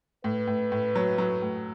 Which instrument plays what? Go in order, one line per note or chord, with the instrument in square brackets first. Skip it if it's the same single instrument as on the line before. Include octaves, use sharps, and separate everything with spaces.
[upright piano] A2 [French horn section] B4
[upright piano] A2
A2
F#3
F#3
A2